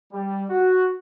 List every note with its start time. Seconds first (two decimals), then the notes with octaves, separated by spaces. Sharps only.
0.13 G3
0.50 F#4